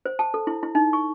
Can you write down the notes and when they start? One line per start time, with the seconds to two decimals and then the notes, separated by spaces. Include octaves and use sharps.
0.06 C5
0.19 A5
0.34 A4
0.47 E4
0.63 E4
0.75 D#4
0.93 C#6